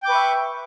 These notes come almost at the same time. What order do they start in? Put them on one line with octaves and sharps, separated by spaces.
G5 D6 B4 C#6 E5